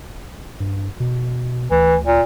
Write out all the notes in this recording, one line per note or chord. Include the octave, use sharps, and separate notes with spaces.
G2
B2
D2 E3
A#2